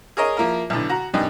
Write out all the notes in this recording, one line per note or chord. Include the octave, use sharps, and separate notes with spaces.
G#4 A#4 C#5 D#5
F3 A#3 E4 A#4
B1 A2 D3
F#4 A#5
F#2 B2 D4 D#4 G4